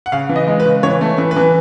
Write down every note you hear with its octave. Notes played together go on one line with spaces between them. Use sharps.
F#5
C#3 F5
E3
D#5
G#3
B4
C#3
E3 C#5
A3
E3
B4
E3